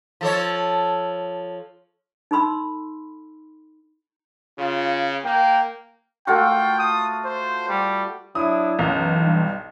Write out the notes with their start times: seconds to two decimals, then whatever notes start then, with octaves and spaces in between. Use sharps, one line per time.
0.21 F3 A4 C#5
2.31 D#4 A4 B5 C6 E6
4.59 C#3 F4
5.24 A#3 G5
6.27 A3 F4 F#4 G5
6.79 D#6
7.25 C5
7.69 G3
8.35 F#3 D4 E4 D#6
8.79 B1 F#2 E3
9.22 G2